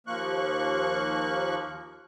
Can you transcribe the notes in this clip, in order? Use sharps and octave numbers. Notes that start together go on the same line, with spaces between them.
D#2 F3 A#3 C#6 F#6